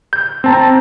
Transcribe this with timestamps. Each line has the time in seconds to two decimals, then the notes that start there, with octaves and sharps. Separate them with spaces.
0.13 G6
0.44 C4 A5 A#5